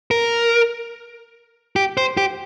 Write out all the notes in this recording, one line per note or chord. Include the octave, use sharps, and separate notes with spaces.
A#4
G4
C5
G4